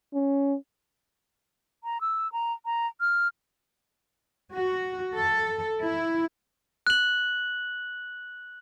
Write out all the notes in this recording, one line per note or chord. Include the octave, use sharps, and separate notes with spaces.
C#4
A#5
E6
A#5
A#5
F6
F#4
A4
E4
F#6 F#7